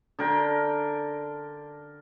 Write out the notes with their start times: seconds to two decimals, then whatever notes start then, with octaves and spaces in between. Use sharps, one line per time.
0.19 D3 A#4 G5